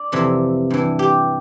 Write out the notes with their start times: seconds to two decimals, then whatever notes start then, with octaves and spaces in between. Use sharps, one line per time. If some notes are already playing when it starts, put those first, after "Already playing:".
Already playing: D5
0.12 F2 C3 E3
0.70 G2 E3
0.99 G4